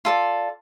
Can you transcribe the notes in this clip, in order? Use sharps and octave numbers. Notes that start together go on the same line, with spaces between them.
F4 A4 D5